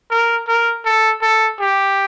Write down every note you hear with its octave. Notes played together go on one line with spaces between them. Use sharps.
A#4
A#4
A4
A4
G4